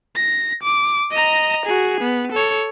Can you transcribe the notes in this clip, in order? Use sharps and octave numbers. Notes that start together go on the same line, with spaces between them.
A#6
D6
D#5 A#5
F#4 G#4
B3
A4 C#5